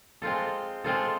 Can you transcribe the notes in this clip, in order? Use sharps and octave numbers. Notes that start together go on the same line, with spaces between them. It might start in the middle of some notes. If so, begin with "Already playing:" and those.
G#3 C4 F4 A4
G#3 C4 F4 A4